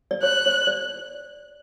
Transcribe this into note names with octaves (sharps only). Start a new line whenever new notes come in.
D5
C#5 F#6
C#5
D5